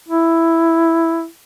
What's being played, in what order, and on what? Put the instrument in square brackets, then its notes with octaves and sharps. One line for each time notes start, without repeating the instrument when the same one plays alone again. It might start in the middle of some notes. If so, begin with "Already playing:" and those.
[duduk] E4